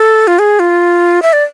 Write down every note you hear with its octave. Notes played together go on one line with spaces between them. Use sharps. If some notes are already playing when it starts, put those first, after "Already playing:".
Already playing: A4
F4
G#4
F4
E5
D5